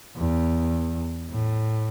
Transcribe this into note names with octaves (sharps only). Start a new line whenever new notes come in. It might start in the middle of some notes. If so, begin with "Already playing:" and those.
E2
A2